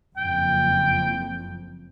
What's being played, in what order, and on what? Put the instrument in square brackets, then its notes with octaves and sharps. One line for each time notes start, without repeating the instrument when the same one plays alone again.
[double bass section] F#1 F2 [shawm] G5